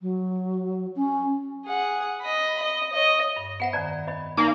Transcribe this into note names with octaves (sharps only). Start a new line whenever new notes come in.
F#3
C#4
G#4 F#5
D#5 B5
D#5
C#5 D#5
G2
B3 C5 E5 F#5 B5
F2 D#3 D5 A#5
C#5 D#5 B5
A#3 D#4 D5 G#5